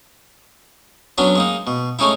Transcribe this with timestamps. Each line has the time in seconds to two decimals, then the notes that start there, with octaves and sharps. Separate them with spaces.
1.18 F#3 B3 C#4 D4
1.36 G#3 A#3 D#4
1.67 B2
1.99 G#3 A3 C#4 D#4 E4